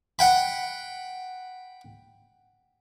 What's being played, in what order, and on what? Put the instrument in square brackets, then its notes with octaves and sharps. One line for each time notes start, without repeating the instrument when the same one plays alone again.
[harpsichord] F#5 G5 B5